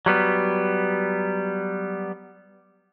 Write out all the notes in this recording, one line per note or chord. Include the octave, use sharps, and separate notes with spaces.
F#3 G3 B3